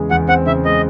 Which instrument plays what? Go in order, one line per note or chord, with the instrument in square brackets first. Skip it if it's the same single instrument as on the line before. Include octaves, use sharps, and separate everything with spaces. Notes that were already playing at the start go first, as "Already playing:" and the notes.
Already playing: [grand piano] E2 C#3 G#3
[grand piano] E2 [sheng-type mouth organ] F#5
[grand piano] C4 [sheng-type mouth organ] F#5
[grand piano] C#3 [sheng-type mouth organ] E5
[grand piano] G#3 [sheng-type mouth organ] D#5